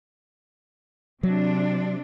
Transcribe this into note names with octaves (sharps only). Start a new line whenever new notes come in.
C3 F#3 D4